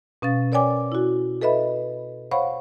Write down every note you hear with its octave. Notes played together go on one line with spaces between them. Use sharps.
B2 C#4 F5 A6
A#4 C#5 D5 G5 G#5 D6
E4 F#4
A4 B4 D#5 E5 B5
C5 C#5 F5 F#5 B5 C#6